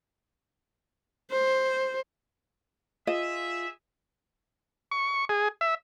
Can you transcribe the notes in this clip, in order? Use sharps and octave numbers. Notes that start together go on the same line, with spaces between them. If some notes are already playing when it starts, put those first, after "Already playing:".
C5
F4 G#4 D#5 E5
C#6
G#4
E5